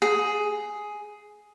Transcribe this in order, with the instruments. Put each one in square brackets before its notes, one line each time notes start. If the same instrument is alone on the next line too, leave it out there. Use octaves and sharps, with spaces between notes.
[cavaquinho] G#4